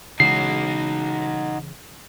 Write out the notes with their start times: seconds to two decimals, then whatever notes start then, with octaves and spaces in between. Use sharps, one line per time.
0.20 C#3 E3 G#3 D#4 F#4 C7